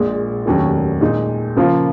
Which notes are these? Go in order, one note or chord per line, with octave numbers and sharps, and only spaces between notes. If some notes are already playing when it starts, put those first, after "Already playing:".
Already playing: A#1 A#2 G#3
F1 D#2 D#3 F#3 C#4
A#2 G#3 D#4
C#3 F3 A#3 F4